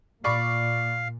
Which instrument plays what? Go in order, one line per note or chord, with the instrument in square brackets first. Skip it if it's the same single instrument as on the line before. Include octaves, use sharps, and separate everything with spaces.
[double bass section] A#2 [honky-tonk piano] D5 B5 C#6 [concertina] F5